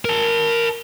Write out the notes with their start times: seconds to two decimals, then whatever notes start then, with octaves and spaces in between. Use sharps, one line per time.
0.05 A#4 A5